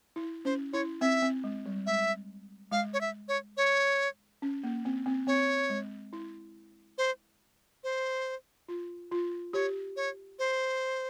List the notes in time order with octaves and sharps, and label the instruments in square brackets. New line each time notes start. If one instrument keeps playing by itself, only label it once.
[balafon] E4
[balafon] C#4 [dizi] C5
[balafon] E4 [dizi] C#5
[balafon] C4 [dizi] E5
[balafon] C4
G#3
G3
[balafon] G#3 [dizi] E5
[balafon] G#3 [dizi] F5
[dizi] C#5
E5
C#5
C#5
[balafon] C#4
A#3
C4
C4
[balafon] C4 [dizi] C#5
[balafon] G#3
E4
[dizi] C5
C5
[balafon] F4
F4
[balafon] G4 [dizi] C#5
[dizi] C#5
C5